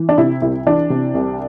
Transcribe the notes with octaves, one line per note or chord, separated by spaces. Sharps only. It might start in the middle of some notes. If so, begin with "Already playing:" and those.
Already playing: E3
D4
C3 E4
C2 E4
E3 D4
C3
C2